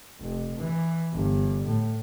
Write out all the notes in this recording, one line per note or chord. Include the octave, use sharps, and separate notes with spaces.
F1
E3
G1
A2